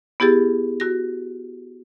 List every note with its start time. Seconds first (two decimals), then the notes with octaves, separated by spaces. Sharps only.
0.20 B3 E4 G4 G#4 A6
0.80 F#4 A#6